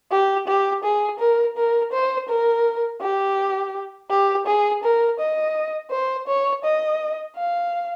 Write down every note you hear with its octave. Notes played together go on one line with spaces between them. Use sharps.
G4
G4
G#4
A#4
A#4
C5
A#4
G4
G4
G#4
A#4
D#5
C5
C#5
D#5
F5